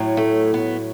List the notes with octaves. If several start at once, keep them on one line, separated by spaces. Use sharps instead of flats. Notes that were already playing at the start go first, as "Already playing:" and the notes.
Already playing: A2 F#3
A3
B3